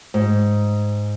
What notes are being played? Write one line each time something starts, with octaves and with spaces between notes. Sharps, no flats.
G#2